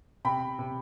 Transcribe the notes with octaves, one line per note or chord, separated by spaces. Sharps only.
C3 G5 B5
C3